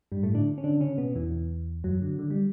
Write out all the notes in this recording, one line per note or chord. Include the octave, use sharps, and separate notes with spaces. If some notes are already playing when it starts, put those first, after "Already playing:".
G2 G3
A2 A3
D3 D4
C#4
D3 D4
C#3 C#4
B2 B3
E2 E3
F#2 F#3
D3
D3
G3